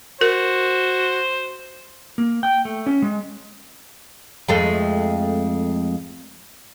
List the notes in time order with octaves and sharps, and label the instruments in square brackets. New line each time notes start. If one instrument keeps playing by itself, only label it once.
[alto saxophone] F#4 [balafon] A#4 [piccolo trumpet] C5
[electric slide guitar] A#3
G5
A3
C#4
G#3
[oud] F2 G#3 A3